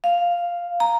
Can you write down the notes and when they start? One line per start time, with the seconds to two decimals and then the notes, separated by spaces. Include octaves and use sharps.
0.04 F5
0.80 A#5